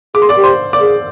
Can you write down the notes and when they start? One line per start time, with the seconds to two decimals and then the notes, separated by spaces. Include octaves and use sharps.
0.15 G#4 D6
0.22 C6
0.29 D5 D6
0.37 G4
0.44 C5 C6
0.73 D5 D6
0.80 G#4